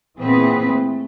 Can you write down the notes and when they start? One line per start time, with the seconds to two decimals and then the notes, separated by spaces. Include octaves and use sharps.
0.19 A#2 E3 B3 C4 G#4 B4
0.72 A3